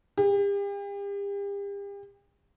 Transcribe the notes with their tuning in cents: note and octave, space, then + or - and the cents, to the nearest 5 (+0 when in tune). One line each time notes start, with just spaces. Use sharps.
G4 +40